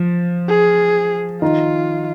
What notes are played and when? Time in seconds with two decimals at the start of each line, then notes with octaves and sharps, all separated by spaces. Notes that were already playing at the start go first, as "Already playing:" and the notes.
Already playing: F3
0.49 G#4
1.42 D#3 D#4 F4